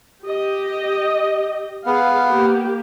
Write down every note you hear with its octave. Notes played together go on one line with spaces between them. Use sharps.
G4 D#5
B3 G#4 F5
A#3 G4